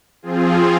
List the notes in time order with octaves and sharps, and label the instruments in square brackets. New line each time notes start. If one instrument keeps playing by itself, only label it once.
[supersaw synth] F3 C4 F4 G#4